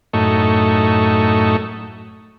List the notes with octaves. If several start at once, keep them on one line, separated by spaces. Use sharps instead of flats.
F#2 A2 A3 D#4 C#6